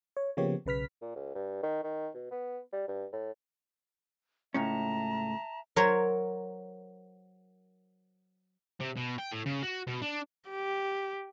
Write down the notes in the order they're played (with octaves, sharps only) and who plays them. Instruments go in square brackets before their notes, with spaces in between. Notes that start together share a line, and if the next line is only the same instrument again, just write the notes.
[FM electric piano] C#5
C#3 F3 A#3 B3 G4 C#5
B1 C#3 B4 F6 B6
[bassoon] A#2
C#2
G2
D#3
D#3
B2
B3
G3
G2
A2
[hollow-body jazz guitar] C#2 A2 C#4 [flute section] E5 A5 A#5
[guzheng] F#3 A#4 C5 C#5 A#5
[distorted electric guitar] C3
B2
G5
A2
C#3
F#4
B2
D4
[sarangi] G4